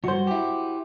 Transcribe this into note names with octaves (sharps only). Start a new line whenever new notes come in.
C#2 G2 F#4 C5
E4 G4